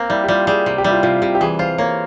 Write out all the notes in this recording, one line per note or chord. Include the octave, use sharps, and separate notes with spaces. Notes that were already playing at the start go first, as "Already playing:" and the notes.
Already playing: A#3 C4
G3 E4
G4
G3 F4
G3 G#4
C3
G4
G3 E4
F4
C3 F4
C3 G4
G4
E3 G#4
F4 C5
A#3 C#5